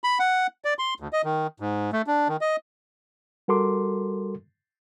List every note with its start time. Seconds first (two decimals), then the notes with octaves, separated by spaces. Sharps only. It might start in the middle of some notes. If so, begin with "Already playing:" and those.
0.04 B5
0.19 F#5
0.65 D5
0.79 C6
1.00 D2
1.13 D#5
1.24 D#3
1.60 G#2
1.93 A3
2.07 D4
2.28 D#3
2.41 D#5
3.48 G3 F#4 A4 A#4 C6 D6